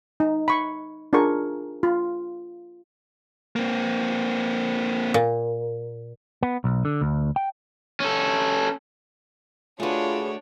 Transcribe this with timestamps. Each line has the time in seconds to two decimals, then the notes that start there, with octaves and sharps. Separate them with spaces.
0.20 D#4
0.48 B5 C#6
1.13 D4 F4 G#4 A#4 C#6
1.83 F4
3.56 A#3 C4
5.14 A#2
6.43 B3
6.64 B1
6.85 D3
7.01 D2
7.36 G5
8.00 C#4 A4
9.80 A3 D4 F4 F#4 G#4 B4 C#5